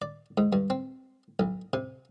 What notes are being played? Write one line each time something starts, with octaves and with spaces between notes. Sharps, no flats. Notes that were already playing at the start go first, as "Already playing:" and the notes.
D5
G#2
G2
C4
B1
C3